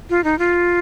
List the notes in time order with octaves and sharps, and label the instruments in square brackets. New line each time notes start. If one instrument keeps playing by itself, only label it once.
[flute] F4
D#4
F4